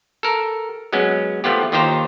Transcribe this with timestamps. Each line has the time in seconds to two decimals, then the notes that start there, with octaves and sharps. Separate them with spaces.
0.23 A4 A#4
0.93 F#3 G#3 B3 C#4
1.44 F3 A3 B3 F4 G4
1.72 D#2 D#3 F4 G4 C5 A#5